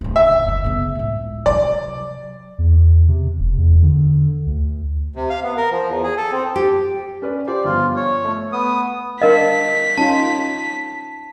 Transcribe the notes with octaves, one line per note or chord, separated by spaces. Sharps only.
D1 C#3
E5
F#1 D3
C#3 B3
C#2 A2
C3 F#3 D5
E2
C3
E1
E2
D3
D2
C3
F5
B3
A#4
F3
E2
G#4
A4
C4
G4
C#4 B4 D5
F4 G4 C5 D5
G1 F3 F4
C#5
A3
B3 D#6
D4 A#4 D#5 F5 B6
C#4 D#4 F4 A5